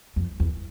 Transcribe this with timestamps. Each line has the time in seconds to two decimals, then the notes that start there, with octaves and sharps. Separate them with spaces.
0.16 F2
0.40 E2